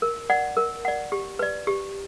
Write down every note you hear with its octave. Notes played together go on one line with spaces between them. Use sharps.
A#4
D5 F#5
A#4
D5 F#5
G4
B4 D5
G4